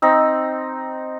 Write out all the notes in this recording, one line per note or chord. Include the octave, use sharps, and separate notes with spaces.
C4 D#4 E6